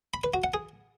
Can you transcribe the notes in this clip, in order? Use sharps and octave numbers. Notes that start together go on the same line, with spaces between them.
B5
B4
F#4
F#5
G#4